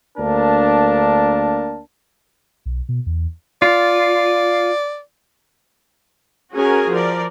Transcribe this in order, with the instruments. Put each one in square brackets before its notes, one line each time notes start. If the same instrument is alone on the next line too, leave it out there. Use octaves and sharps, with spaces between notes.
[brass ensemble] D2 A#3 D4 A#4 A5
[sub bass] B1
B2
E2
[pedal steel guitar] F4 [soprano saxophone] D5
[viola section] C#4 F#4 G#4 A#4 G#5
F3 A#4 D5